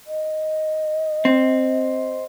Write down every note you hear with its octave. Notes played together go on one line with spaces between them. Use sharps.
D#5
C4